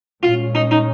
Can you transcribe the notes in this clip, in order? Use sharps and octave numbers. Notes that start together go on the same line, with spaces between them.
A#2 G#3 C#4 F4
D#4
D#4